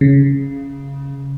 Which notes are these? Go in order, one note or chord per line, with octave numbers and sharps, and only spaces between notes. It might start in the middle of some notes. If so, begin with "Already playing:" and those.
C#3